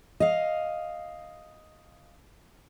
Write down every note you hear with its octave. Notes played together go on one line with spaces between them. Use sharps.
D#5 F5